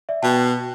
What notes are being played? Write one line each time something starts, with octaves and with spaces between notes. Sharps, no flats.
D5 E5
B2 G5 A5